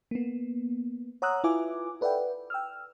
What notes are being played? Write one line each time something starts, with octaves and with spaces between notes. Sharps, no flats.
A#3 B3
C#5 F#5 A#5 D#6 E6 F#6
E4 F4 B4 E5 G#5 D6
A4 B4 D5 E5 F#5 G5
G5 E6 F6